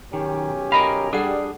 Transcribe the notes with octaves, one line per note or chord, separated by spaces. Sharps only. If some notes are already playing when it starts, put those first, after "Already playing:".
B1 D#3 C#4 G4
F4 A#4 D#5 F5
G3 D4 G#4 A4 F#5